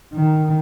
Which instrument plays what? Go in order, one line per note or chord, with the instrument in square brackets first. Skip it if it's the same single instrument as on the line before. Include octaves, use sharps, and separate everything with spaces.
[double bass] D#3